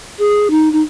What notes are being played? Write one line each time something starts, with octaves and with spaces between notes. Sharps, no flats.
G#4
D#4
D#4